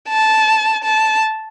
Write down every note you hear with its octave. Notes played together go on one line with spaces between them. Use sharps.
A5
A5